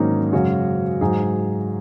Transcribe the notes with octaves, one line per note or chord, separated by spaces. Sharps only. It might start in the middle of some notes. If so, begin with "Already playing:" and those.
Already playing: G#2 D#3 F#3 A#3 C#4 D#4
F#2 C#3 G#3 C#4 F#4
G#2 F#3 D#4 G#4